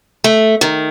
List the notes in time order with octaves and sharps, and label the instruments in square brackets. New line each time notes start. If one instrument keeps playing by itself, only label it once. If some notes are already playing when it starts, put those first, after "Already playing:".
[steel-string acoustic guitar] A3
D#3